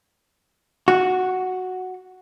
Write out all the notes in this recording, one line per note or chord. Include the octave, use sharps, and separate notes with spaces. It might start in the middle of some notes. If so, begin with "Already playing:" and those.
F#4